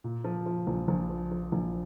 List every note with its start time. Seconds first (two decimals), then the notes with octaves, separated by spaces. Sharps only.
0.04 A#2
0.24 F3
0.46 F3
0.67 A#1
0.88 A#1
1.09 F3
1.32 F3
1.52 A#1